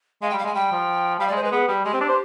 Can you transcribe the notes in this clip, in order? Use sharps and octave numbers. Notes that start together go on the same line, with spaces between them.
G#3 F5
G5
G3
F5
G#3 G#5
G3 G5
F3
G3 F5
D5
G#3
C5
G#3 B4
B3 G#4
G3 G4
G#3 G4
C4
D4
C5